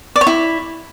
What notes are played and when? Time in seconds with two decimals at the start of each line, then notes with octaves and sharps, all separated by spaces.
0.16 D5
0.21 C#5
0.27 E4